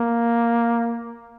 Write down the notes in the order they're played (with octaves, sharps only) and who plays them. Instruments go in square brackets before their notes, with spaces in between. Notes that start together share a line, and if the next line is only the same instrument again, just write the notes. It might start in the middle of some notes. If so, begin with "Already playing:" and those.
Already playing: [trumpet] A#3